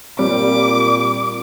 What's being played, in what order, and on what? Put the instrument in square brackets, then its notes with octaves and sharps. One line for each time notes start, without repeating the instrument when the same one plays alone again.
[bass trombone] A#2 [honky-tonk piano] G3 [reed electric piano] C4 [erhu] D6